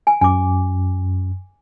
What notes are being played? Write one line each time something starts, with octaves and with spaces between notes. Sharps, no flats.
G#5
F#2 G#5 D6